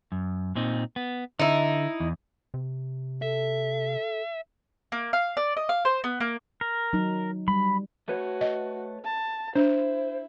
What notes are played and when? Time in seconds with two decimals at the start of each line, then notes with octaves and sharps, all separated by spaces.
0.12 F#2
0.55 A#2 C4 D#4
0.96 B3
1.39 D3 D#4 E4
2.00 E2
2.54 C3
3.22 A4 E5
4.92 A#3
5.13 F5
5.37 D5
5.57 D#5
5.69 F5
5.85 C5
6.04 B3
6.20 A#3
6.61 A#4
6.93 F#3 D#4
7.48 G3 B5
8.08 A3 F#4 B4 C#5
8.41 D#5
9.04 A5
9.55 D4 E4 C5